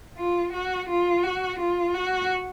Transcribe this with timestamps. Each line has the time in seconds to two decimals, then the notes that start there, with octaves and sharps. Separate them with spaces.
0.18 F4
0.54 F#4
0.89 F4
1.23 F#4
1.59 F4
1.94 F#4